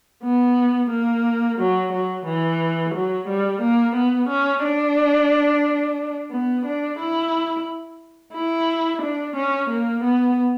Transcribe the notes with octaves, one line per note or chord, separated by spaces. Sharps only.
B3
A#3
F#3
F#3
E3
F#3
G3
A#3
B3
C#4
D4
B3
D4
E4
E4
D4
C#4
A#3
B3